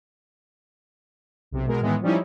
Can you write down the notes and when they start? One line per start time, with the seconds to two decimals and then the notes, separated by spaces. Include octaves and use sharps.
1.51 B1 C3
1.66 B2 G#3 A#4
1.81 A2 D#3 E3 G#3 B3
2.02 F3 G3 C#4 D#4 E4